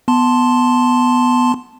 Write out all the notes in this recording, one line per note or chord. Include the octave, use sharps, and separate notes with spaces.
B3 A5 C6